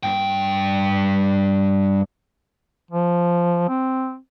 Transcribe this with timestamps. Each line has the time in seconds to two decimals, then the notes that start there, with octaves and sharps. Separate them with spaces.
0.03 G2 G5
2.91 F3
3.69 C4